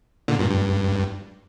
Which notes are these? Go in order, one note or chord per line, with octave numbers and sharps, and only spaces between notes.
A#2 D3
G2 A#2
G2